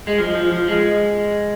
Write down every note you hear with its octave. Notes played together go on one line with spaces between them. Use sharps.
G#3
F3
F3
F3
G#3